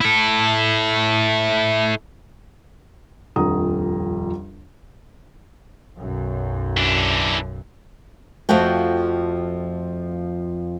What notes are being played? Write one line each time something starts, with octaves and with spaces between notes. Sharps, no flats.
E4 A4
D#1 A#1 F2 F#5 A#5 D#6
B1 F#2
E3 D4
F2 F3 A3 F#4 G5